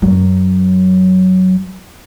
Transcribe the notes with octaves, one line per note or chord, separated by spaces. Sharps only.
F#2 F#3